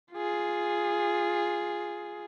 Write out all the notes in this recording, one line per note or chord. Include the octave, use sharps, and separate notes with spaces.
F4 G#4